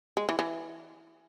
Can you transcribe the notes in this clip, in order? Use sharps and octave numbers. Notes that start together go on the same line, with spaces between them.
G#3
E3
E3